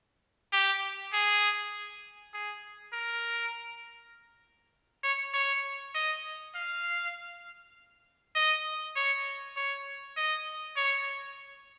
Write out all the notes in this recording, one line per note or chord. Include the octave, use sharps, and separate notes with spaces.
G4
G#4
G#4
A#4
C#5
C#5
D#5
F5
D#5
C#5
C#5
D#5
C#5